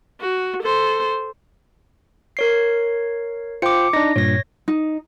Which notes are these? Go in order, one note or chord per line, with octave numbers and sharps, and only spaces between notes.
F#4
A4 C5
A#4 C#5 C7
F4 C5 G5 D6 C#7
D4 D#4 A#6
G2 A#2 C#5 A#6
D#4